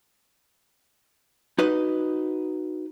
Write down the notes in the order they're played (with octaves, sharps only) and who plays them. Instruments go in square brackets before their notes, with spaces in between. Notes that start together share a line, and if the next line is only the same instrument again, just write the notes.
[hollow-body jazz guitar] D#4 F#4 B4 D#5